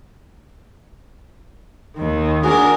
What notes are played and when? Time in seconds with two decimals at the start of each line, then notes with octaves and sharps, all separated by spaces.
1.96 D#2 D#3
2.44 D4 F#4 G#4 A#4